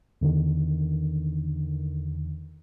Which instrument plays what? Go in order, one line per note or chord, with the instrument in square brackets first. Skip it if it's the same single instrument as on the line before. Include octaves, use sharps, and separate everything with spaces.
[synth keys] E2 D3 D#3